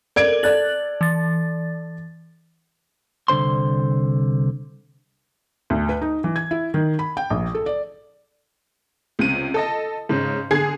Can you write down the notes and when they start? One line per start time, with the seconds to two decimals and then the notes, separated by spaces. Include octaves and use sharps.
0.16 A4 A#4 D5 G#6 D7
0.43 A4 D5 F#6 A6 F#7
1.01 E3 A6
3.28 C2 D3 C5 C6
5.70 D2
5.89 B4
6.02 D#4
6.24 E3
6.36 G#6
6.51 E4
6.74 D#3
6.99 B5
7.17 G5
7.30 A#1
7.55 A4
7.66 D5
9.19 C#2 C3 D#7
9.54 A4 D#5 A5
10.09 G#2 C#3
10.51 D3 G#4 G#6 C7